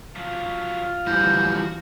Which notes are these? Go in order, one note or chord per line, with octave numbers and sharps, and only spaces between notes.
F3 F#3 F4
E3 F3 G3 F#4 G6